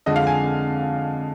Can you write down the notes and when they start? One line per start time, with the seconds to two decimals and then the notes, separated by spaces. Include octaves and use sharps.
0.06 F2 D3 G#3 D#5
0.16 F5
0.27 G#5